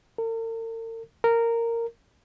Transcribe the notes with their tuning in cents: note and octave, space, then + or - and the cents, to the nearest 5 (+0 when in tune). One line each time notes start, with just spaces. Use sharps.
A#4 -45
A#4 -10